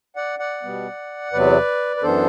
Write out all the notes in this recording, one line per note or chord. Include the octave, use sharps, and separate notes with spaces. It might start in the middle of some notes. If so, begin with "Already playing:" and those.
D5 F#5
D5 F#5
B2 G3 B3
E2 C3 F#3 B3 B4 D5
B4
F#2 E3 B3 D4 A4 C5